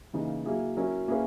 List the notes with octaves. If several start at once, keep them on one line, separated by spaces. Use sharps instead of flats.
C#3 E3 A#3 D#4
F#3 A#3 E4 G#4
F#3 C#4 E4 A#4
A#3 C#4 E4 G#4 B4